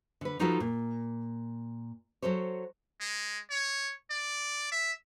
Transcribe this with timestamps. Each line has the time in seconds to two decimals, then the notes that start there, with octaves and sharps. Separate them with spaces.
0.21 D3 B4
0.39 F3 D#4 F4 F#4 A4 B4
0.60 A#2
2.22 F#3 F#4 A4 C5 C#5
3.00 G#3
3.50 C#5
4.11 D5
4.72 E5